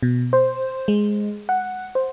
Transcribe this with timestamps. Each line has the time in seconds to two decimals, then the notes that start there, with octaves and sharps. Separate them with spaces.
0.03 B2
0.33 C5
0.88 G#3
1.49 F#5
1.95 C5